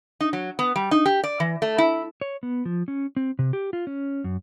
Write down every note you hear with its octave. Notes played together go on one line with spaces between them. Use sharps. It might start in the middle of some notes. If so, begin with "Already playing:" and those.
D#4
F#3
B3
G3
D#4
G4
D5
E3
A3
E4
C#5
B3
F3
C#4
C4
C3
G4
F4
C#4
F#2